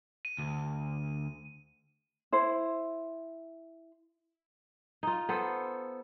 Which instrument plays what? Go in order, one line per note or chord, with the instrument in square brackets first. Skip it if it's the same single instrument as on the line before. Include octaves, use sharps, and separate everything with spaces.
[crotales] D#7
[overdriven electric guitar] D2
[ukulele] E4 C5
[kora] D#4 F4
B3 A4 C5